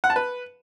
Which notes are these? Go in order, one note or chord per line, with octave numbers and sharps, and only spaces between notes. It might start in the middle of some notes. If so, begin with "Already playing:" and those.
F#5
A5
B4